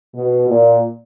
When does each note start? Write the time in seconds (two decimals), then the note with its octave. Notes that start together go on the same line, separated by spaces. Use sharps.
0.15 B2
0.48 A#2